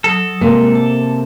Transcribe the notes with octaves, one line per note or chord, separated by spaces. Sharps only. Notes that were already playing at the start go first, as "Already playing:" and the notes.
F#3 A4 D#6
C3 G#3 A#3 C4 A#4
A5